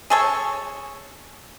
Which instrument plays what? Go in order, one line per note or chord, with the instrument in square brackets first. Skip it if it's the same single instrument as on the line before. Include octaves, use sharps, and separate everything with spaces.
[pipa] G#4 A4 C#5